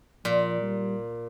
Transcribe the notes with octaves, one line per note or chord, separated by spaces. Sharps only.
A#2 F3
G3